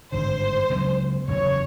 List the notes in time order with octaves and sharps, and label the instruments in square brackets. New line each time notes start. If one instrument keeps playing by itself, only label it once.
[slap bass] G#1 G2 D3 [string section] C5
[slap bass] C#2 C#3 F#3 B3
[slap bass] F#1 E2 C#3 E3 [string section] C#5